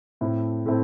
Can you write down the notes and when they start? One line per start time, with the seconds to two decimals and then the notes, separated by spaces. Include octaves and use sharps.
0.21 A2 A3 C4 E4
0.65 A2 A3 C4 E4